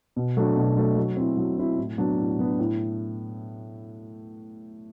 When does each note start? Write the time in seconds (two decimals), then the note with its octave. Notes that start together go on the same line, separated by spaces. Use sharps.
0.16 B2
0.37 F#3 A3 D4
0.57 B2
0.77 F#3 A3 D4
0.97 F#3
1.17 C4 E4
1.37 F#3
1.58 C4 E4
1.78 A2
1.98 F#3 B3 D4
2.19 A2
2.39 F#3 B3 D4
2.59 A2